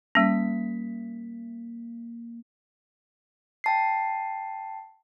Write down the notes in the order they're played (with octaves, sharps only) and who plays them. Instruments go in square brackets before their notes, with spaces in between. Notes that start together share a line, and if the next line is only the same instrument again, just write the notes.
[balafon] G3 C#4 [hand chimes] A#3 B6
[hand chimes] G5 A5 C7